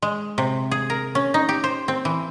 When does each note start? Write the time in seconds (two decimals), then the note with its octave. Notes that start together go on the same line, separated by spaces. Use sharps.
0.02 G#3
0.38 C3
0.71 G#4
0.90 A#4
1.15 C#4
1.34 D#4
1.49 G4
1.64 C5
1.88 C4
2.05 E3